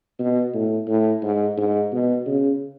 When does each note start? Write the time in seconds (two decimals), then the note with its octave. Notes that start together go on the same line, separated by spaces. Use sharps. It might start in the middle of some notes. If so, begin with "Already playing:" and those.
0.19 B2
0.54 A2
0.87 A2
1.22 G#2
1.57 G#2
1.92 B2
2.26 C#3